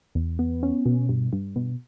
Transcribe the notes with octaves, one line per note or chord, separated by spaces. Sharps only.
E2
B3
C#4
B2
G2
G2
B2